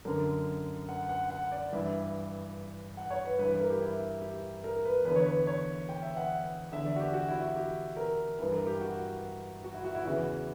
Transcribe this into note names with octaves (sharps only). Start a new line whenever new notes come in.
F#2 D3 A#4
F#5
F#5
F#5
D5
G2 E3 E5
F#5
C#5
B4
G2 E3 B4
B4
A#4
G4
E4
G4
A#4
B4
E2 D3 B4
C#5
B4
C#5
G5
E5
F#5
E2 D3 E5
D5
F#4
G4
F#4
E4
F#4
G4
A#4
G2 E3 B4
A#4
G4
F#4
F#4
E4
F#4
E4
E2 C#3 E3 F#4